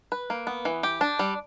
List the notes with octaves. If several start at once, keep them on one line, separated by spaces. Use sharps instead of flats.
B4
A#3
B3
E3
G4
D4
G3